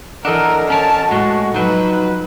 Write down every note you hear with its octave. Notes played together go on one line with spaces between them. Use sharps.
E3 D4 A4 A#4 D#5 F#5
C#4 A#4 C#5 A5
A2 G#3 F#4
F3 F#3 D#4 B4